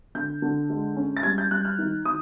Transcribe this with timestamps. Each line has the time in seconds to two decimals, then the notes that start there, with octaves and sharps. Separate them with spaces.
0.15 D3 G6
0.42 D3
0.70 G#3
0.97 C#4
1.17 A6
1.23 G3 G#6
1.38 G6
1.51 G3 F#6
1.65 F6
1.79 D#3
2.05 D#3 D#6